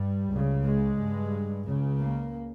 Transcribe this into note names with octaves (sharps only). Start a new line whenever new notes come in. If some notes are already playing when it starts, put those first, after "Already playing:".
Already playing: G2 G3
C#2 C#3
G#3
G2
C#2 C#3
A#3